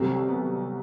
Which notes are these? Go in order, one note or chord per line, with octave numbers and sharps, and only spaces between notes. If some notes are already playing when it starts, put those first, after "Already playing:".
Already playing: C2 C3 F#3 A3 C4
B3